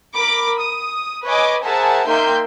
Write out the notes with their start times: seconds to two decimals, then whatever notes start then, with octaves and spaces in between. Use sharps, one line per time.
0.15 A#4 B5 D6
0.59 D#6
1.25 B4 C#5 D#5 G#5 D6
1.63 G#4 A#4 C5 E5 F#5 A5
2.07 A#3 D#4 E5 G5 C6 G6